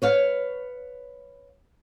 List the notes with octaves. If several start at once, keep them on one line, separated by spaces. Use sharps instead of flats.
B4 C#5 F5